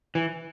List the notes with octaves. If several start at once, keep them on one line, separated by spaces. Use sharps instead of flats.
E3